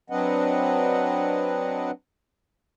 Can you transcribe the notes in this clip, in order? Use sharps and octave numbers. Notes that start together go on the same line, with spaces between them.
F#3 C4 D4 B4 D#5 F#5